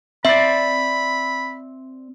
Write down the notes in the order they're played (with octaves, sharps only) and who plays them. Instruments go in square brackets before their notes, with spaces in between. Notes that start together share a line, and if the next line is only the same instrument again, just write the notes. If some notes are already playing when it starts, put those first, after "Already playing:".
[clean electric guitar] C4 D5 [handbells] E5 [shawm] B5